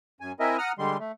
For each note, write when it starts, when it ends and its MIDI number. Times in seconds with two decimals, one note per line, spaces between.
0.21 0.32 42
0.21 0.32 80
0.40 0.57 60
0.40 0.57 64
0.40 0.57 70
0.40 0.57 75
0.40 0.57 76
0.40 0.57 80
0.58 0.72 78
0.58 0.72 82
0.58 0.72 87
0.58 0.72 89
0.79 0.97 50
0.79 0.97 55
0.79 0.97 56
0.79 0.97 84
0.99 1.12 57